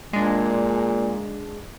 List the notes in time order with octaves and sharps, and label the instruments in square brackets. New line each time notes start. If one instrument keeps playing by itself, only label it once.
[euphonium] A#2 [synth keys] G#3 D4